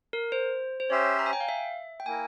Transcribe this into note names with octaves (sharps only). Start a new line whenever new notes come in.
A#4
C5
C5
C#4 G4 C5 C#5 E5
A#5
G#5
G5
F5
E5
G5
A#3 E4 A#4 G#5